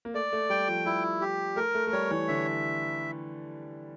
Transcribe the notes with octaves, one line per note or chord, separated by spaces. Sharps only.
A#3
A3 D5
A3
G3 G5
F3
G3 E4
G4
A3 A#4
A3
A3
G3 C#5
E3
D3 E5